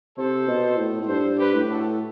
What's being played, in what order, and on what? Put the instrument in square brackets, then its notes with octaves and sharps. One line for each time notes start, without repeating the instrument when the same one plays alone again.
[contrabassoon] C3 [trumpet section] A4 C5
[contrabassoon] B2
A2
A2
[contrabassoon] G2 [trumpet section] A4 C5
[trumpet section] G4 B4
[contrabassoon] A2
[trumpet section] F#4 A4